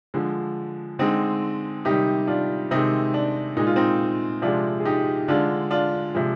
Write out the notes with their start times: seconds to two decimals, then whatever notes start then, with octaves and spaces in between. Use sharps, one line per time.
0.14 D3 F3 G#3
0.99 D3 G#3 C4 D#4
1.85 C3 D#3 G3 D#4 G4
2.27 D4 F4
2.71 C3 D#3 G#3 C4 D#4
3.14 D4
3.57 A#2 G#3 D#4
3.67 F4
3.76 C4 D#4
4.42 C3 F3 G#3 D4 F4
4.80 G#4
4.85 D#4 G4
5.28 D3 G#3 D4 F4
5.71 D4 F4
6.15 C3 F3 G#3